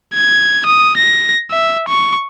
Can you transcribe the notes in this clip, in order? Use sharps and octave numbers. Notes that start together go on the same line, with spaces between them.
G#6
D#6
A#6
E5
C#6